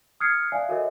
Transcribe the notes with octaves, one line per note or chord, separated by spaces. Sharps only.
D#6 F6 F#6 G#6 C7 C#7
D5 E5 F5 G#5
F#4 A4 A#4 C#5 D#5 E5